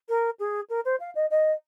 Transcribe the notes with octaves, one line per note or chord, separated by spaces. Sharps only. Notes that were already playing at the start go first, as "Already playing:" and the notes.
A#4
G#4
A#4
C5
F5
D#5
D#5